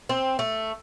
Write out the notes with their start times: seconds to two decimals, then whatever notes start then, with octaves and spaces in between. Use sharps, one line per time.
0.09 C4
0.39 A3